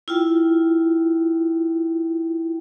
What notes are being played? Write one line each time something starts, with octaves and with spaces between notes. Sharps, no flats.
E4 F4 G5